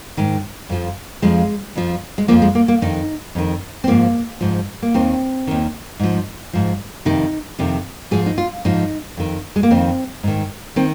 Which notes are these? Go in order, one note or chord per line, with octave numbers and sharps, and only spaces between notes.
G#2 D#3
F2 F3
F2 F3 G#3
F2 F3
G#3
F2 F3 A#3
G#3
A#3
A#3
F2 D#3 D#4
F2 D#3
C4
G#2 F3 A#3
G#2 F3
A#3
D#2 D#3 C4
D#2 D#3
G#2 F3
G#2 F3
F2 C3 D#3 D#4
F2 C3 D#3
G#2 F3 G#4
D#4
F4
G#2 F3 D#4
F2 D#3
G#3
A#3
F2 D#3 C4
G#2 D#3
D#3 C4